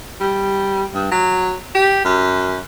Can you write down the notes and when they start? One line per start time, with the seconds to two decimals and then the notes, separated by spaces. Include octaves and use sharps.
0.21 G3
0.94 G2
1.11 F#3
1.75 G4
2.05 F#2